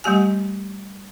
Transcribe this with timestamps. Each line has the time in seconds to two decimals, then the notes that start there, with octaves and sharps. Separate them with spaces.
0.04 G3 A3 G4 G#5